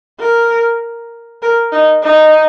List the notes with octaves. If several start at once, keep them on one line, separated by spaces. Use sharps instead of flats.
A#4
A#4
D#4
D#4